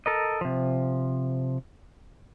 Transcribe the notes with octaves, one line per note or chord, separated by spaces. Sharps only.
A4 A#4 D#5
C3 F3